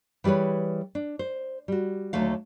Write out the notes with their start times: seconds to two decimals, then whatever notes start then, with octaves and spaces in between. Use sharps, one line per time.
0.24 E3 G3 G#4 B4 C#5
0.95 D4
1.19 C5
1.68 G3 F#4
2.13 D#2 D3 F#3 A3 F5